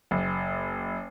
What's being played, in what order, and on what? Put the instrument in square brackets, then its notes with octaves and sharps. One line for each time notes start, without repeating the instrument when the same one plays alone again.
[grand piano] F#1